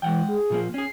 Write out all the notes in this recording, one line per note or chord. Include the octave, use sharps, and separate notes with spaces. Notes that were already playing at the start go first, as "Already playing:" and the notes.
E3 G#3 F#5 G5
G#4
A#2 F3 A#3
C#4 G#4 C7